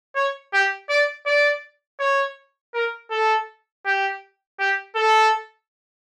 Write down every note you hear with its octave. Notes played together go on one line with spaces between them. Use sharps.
C#5
G4
D5
D5
C#5
A#4
A4
G4
G4
A4